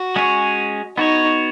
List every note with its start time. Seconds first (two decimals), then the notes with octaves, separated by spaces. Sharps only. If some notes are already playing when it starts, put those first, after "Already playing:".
Already playing: F#4
0.16 G#3 C#4 G#4 C#5
0.97 B3 D#4 F#4 C#5